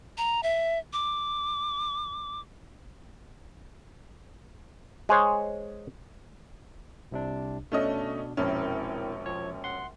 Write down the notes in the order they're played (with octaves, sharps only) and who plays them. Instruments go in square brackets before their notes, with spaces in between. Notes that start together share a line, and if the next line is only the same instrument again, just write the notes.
[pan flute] A#5
E5
D6
[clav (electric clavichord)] G#3 G#4 C5 C#5
[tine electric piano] C2 C3 D4
[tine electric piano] B2 D4 [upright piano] A3 C#4 D#5
[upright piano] E1 A#1 C#4 [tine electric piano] C4 E4 A#4
[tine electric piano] F3 C#5
F#5 C6